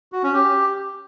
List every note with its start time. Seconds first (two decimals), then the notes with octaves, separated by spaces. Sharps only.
0.12 F#4
0.23 C#4
0.34 G4